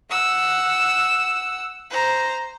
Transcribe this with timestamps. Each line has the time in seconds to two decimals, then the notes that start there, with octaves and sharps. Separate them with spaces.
0.10 F#5 E6
1.90 C5 A#5